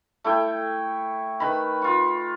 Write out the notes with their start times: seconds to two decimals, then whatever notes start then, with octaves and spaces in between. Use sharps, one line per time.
0.24 A3 E4 G5
1.40 D#3 B4 B5
1.82 F4 C#6